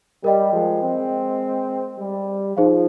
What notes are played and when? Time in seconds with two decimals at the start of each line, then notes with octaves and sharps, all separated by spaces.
0.24 G3 A#4 D#5 G5
0.53 F3 G#3
0.83 G#3 C4
1.99 G3
2.56 F3 D#4 G#4 C5 F5